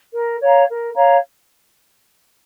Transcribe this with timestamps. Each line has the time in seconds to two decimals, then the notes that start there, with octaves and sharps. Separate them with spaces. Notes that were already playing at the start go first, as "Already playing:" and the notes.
0.13 A#4
0.41 C#5 F5 A#5
0.67 A#4
0.94 C#5 F5 A#5